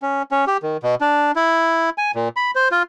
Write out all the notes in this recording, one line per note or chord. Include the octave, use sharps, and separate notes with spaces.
C#4
C#4
G4
D#3
B2
D4
E4
G#5
A#2
B5
C5
F4